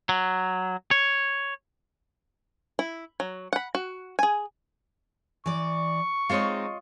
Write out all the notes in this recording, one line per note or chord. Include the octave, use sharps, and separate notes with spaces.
F#3
C#5
E4
F#3
F#5 B5
F#4
G#4 G#5
E3 D5 C#6
G#3 C4 D#4 F4 C#5 D#5